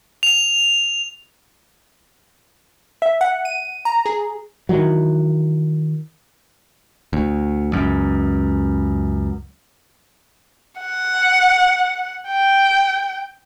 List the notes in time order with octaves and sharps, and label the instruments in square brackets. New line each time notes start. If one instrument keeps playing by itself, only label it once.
[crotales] F7
[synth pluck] E5
F#5
D#7
A#5
G#4
[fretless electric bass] D#3 E3 F#3
[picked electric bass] D2
C#2 F#2
[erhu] F#5
G5